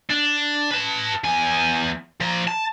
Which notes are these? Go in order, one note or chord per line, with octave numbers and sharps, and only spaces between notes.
D4
B4 A5
E2 G#5
F3 A#5
A5